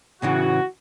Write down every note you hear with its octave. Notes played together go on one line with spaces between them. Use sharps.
A2 C#3 E3 F#4